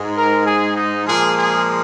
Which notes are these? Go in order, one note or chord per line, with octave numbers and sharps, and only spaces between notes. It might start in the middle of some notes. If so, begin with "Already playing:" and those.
Already playing: G#2 G#3
A#4
G#4
D#4
A#2 F3 G#3 G#4
G#4